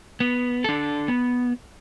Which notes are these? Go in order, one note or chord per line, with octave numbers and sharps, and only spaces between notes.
B3
D4 A4
B3